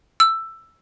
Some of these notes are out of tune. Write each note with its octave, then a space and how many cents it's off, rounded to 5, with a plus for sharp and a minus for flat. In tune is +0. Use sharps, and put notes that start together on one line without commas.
E6 +10